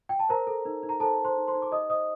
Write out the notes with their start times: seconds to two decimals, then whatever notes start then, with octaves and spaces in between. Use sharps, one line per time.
0.09 G5
0.19 A5
0.29 A#4 C5 A#5
0.47 A4
0.65 D#4
0.83 D#4
0.89 A#5
1.00 A4 C5 A5
1.18 A4
1.24 C5 C6
1.37 D#4
1.48 C5 C6
1.54 D#4
1.62 D6
1.72 G4 D#5 D#6
1.89 C5 D#5 D#6